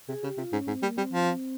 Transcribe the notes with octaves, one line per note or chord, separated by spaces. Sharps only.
C3 G#4
C#3 G4
C3 F4
G#2 C#4
G#2 C4
G3 A#3
G3 C4
F3